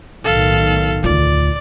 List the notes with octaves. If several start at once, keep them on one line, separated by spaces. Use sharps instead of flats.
B1 A2 D#3 A4 F5
D2 F4 D5